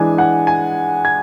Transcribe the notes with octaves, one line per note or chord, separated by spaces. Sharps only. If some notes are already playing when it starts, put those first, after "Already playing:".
Already playing: E3 G#3 D4 G#5
F#5
G#5
G#6